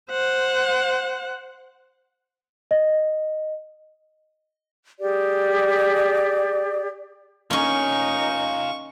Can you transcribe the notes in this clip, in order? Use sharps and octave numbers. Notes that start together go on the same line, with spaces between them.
C5 F#5
D#5
G4 G#4 D5
A#3 C#4 D#4 F4 G#5 C#6